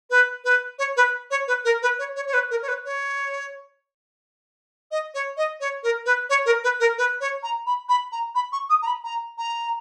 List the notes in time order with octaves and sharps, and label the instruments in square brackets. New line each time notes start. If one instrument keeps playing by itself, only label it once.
[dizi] B4
B4
C#5
B4
C#5
B4
A#4
B4
C#5
C#5
C#5
B4
A#4
C#5
B4
C#5
D#5
C#5
D#5
C#5
A#4
B4
C#5
A#4
B4
A#4
B4
C#5
A#5
B5
B5
A#5
B5
C#6
D#6
A#5
B5
A#5
A#5